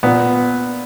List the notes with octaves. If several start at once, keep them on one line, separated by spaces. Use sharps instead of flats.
A#2 B3